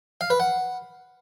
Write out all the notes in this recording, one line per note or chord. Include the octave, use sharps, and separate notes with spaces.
F5
B4
F#5